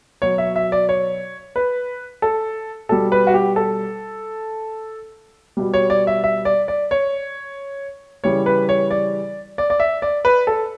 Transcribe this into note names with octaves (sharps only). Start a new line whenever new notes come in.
B2 F#3 C#5
E5
E5
D5
C#5
B4
A4
B2 G3 A4
B4
F#4
G4
A4
B2 G3
C#5
D5
E5
E5
D5
D5
C#5
C#3 E3 G3 C#5
B4
C#5
D5
D5
D5
E5
D5
B4
A4